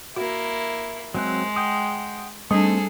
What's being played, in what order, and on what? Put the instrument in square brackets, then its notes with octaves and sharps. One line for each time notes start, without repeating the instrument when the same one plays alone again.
[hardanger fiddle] A#3 E4 [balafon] F#4
[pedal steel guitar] F#3 C4 F#6 [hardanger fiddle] G#3
[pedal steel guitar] F#5 G5 D#6
[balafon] G3 D4 [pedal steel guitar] A3 C4 D#4 [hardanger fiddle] G#4 A4